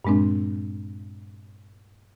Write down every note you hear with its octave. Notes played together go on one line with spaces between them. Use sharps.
G2 A#2 G#3 C4 D4